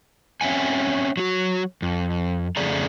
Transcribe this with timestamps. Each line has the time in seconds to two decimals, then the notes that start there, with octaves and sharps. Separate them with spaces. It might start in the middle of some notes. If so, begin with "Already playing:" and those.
0.41 C4 C#4 E5 F#5 G#5
1.17 F#3 F#4
1.82 F2
2.57 F2 C#3 A3 G#4 D5 A#5